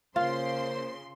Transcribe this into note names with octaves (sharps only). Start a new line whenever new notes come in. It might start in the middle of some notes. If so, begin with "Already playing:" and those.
C#3 A#3 F4 C5 F5 C6